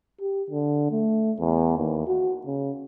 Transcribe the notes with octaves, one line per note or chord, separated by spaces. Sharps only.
G4
D3
A3
E2
D#2
F#4
C#3